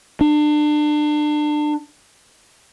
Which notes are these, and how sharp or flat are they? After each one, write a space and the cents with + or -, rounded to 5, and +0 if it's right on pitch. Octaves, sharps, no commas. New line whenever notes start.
D4 +30